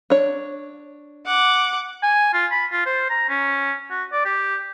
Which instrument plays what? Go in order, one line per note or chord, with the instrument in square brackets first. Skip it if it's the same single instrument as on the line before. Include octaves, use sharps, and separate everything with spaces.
[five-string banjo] D4 C#5
[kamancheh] F#5 D6
[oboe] G#5
F4
B5
F4
C5
A#5
C#4
F#4
D5
G4